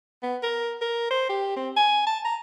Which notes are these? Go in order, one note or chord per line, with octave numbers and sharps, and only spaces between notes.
B3
A#4
A#4
C5
G4
C4
G#5
A5
A#5